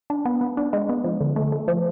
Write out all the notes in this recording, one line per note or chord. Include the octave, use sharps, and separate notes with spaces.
D4
B3
B3
D4
G#3
B3
F3
D3
A3
A3
F3